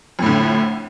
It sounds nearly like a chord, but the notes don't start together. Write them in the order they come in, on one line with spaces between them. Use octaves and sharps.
F2 A2 D3